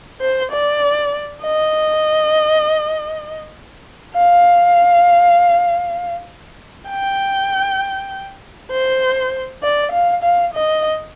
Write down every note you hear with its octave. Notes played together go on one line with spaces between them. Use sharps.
C5
D5
D#5
F5
G5
C5
D5
F5
F5
D#5